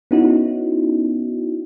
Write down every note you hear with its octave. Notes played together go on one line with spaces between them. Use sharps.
B3 C#4 D#4 E4 F#4